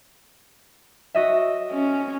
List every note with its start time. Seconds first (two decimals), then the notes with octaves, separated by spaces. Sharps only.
1.14 F#4 D#5 E5
1.72 C#4